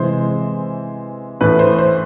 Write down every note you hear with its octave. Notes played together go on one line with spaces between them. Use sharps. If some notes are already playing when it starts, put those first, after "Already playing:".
Already playing: C3 E3 G#3 C5
A2 E3 A3 B4
C5
C5